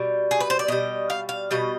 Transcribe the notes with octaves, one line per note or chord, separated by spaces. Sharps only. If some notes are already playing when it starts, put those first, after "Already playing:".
Already playing: B2 G3
G#4
B4
C5
D5
B2 G3 D#5
F5
F5
B2 G3 D#5